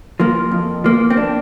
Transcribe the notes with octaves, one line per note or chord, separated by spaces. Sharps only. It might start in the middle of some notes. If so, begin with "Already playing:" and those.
F3 A#3
F2
F3 A#3
C4
D4